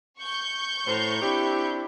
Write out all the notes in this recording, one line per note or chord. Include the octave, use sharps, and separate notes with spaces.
C#6 G6
A2 C5 A#5
C4 D4 E4 G4